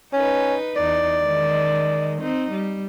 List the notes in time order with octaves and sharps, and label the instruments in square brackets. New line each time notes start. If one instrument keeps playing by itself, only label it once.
[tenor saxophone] C#4 [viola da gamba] D#4 B4
[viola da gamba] E2 D#4 [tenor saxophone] D5
[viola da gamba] D#3 G#3
C4 D#4
G3